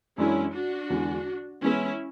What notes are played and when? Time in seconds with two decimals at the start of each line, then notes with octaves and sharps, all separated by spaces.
0.18 F#2 E3 G#3 C#4 D4 E4
0.53 D4 F#4
0.90 E2 D3 G#3
1.62 E3 G#3 B3 C#4 E4